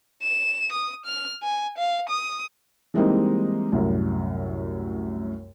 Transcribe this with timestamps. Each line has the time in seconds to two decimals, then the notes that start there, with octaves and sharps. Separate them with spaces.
0.23 E7
0.72 D#6
1.06 F6
1.43 G#5
1.78 F5
2.09 D#6
2.94 E3 G3 G#3 A#3 C4 D#4
3.72 C2 F#2 A2